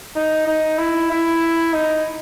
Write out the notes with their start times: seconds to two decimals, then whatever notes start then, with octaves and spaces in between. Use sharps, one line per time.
0.16 D#4
0.47 D#4
0.78 E4
1.11 E4
1.73 D#4